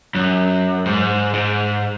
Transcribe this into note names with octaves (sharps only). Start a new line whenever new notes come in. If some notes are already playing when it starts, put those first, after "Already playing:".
F#2
G#2
G#2